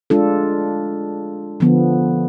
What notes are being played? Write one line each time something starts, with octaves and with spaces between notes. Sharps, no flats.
G#3 D4 F4 A4
D3 F3 B3